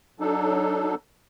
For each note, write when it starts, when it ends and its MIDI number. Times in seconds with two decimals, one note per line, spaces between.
0.20 0.95 54
0.20 0.95 62
0.20 0.95 63
0.20 0.95 69